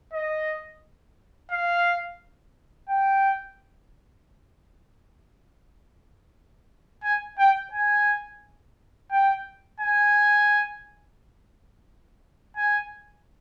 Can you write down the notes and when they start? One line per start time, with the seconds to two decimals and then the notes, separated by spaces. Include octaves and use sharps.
0.14 D#5
1.51 F5
2.89 G5
7.04 G#5
7.39 G5
7.73 G#5
9.12 G5
9.80 G#5
12.56 G#5